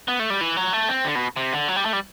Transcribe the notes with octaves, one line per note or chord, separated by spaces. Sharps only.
B3
A3
G3
E3
F#3
A3
C4
D3
B2
C3
D3
F#3
G3
A3
G3